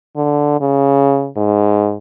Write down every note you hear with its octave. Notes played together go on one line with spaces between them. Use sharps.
D3
C#3
G#2